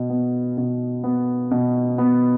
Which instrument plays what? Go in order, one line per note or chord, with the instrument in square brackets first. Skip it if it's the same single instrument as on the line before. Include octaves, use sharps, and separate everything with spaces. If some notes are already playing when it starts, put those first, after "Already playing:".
Already playing: [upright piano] B2
B3
B2
B3
B2
B3